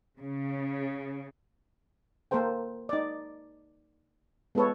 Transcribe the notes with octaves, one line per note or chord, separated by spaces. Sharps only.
C#3
A#3 A4 A#4 C5 G5
D#4 D5
G#3 B3 F4 A4 B4 C#5